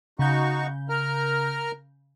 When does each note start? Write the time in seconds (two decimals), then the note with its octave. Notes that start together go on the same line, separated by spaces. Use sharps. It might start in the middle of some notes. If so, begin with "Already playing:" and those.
0.19 C#3 D#4 F#4 C#6 G6
0.89 A#4 A#5 F6